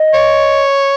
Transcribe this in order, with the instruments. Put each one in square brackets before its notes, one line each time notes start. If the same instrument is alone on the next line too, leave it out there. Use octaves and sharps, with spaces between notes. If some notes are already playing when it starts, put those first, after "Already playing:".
Already playing: [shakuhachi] D#5
[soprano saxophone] C#5